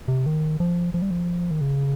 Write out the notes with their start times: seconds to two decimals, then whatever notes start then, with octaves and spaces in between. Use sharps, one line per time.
0.08 C3
0.26 D#3
0.60 F3
0.94 F3
1.02 G3
1.11 F3
1.51 D#3
1.61 C#3